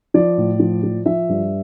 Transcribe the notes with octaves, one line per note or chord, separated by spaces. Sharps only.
F3 D5
A2
F3
F3
F3 E5
G2